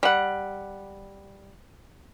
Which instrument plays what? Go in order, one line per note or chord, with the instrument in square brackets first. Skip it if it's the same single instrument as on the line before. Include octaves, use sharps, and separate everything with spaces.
[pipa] G3 F#5